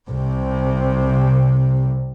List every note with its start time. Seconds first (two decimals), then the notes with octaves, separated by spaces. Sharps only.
0.10 C2 C3